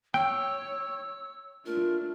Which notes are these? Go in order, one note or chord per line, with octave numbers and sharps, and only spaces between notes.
C#5 G5 E6
A3 D4 F4 A#4